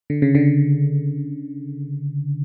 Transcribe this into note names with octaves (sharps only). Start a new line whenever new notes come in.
D3
C#3
D3